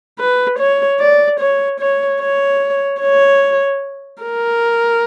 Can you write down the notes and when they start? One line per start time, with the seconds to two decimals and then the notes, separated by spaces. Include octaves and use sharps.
0.19 B4
0.59 C#5
1.00 D5
1.40 C#5
1.80 C#5
2.21 C#5
3.01 C#5
4.23 A#4